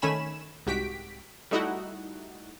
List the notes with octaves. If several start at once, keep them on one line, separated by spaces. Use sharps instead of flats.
D#3 A3 C#4 G#5 B5 E7
C2 G#2 F#4 G4 B6 D7
G3 A3 D#4 E4 F#4 F#5